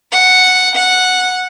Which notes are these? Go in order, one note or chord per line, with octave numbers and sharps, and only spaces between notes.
F#5
F#5